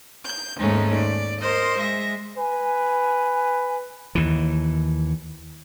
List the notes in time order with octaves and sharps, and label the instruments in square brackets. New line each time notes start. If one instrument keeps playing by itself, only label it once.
[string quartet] G6
D#2 G#2 G#3 A3 C#4 D#4
D5
A#4 C5 D#5 C6
G#3 E5 A#6
[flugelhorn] B4 [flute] G#5
[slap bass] D#2 E3